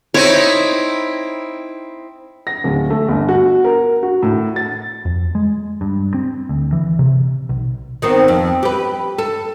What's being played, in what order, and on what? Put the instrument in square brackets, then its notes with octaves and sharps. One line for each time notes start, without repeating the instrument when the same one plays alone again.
[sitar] C4 D#4 E4 [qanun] C#5
[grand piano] A#6
D1
A3
G1
F#4
A#4
F#4
A2
A6
[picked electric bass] F2
G#3
G2
C4
D2
E3
C3
B1
[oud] D#3 B3 C4
F2
G4 B4
A4